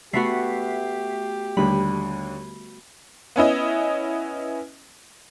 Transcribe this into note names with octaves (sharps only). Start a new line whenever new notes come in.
A3 B3 F#4 G4 E5 B6 C7
D#2 D3 G3 A3 B5
B3 C#4 E4 D#5